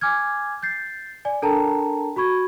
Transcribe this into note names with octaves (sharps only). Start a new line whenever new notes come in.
G#5 D6 F6 G#6
G6 A6 C7
D5 G#5
D4 A4 A#4 G5 A5 A#5
F#4 B5 C#6 G#6